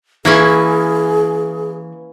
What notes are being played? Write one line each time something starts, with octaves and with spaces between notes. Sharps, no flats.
E3 A#3 C#4 E4 G#4